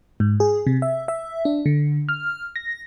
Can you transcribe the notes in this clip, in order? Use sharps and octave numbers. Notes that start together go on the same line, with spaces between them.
G#2
G#4
C3
E5
E5
D4
D3
F6
A#6